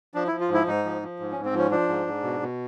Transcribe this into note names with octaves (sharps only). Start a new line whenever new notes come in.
F3 D4
E4
F3
F4
G#2
E4
G#2 D#4
F3
F3
G#2
C#4
G#2
C4
F3 C#4
F3 D4
G#2
G#2
B2
B2